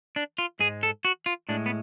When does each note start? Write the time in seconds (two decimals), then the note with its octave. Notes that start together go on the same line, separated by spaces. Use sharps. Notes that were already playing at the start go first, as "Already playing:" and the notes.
0.16 D4
0.38 F4
0.59 G#2 G#3 G#4
0.83 A4
1.05 F#4
1.26 F4
1.49 A2 G#3 D4
1.66 B3